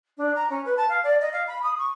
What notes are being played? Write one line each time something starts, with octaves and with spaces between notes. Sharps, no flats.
D4
A#5
C#4
B4
A5
F5
D5
D#5
F5
B5
D#6
C#6